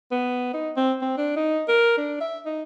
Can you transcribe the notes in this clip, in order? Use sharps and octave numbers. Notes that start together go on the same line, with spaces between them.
B3
D#4
C4
C4
D4
D#4
A#4
D4
E5
D#4